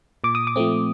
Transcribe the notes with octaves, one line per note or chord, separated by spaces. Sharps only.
A#2 D6
D#6
D6
F3 A3 C4